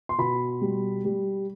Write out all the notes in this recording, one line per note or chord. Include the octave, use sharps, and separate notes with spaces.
C6
B2 B5
G3
G3